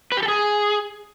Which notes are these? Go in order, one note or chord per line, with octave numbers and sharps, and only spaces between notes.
B4
G4
A4
G#4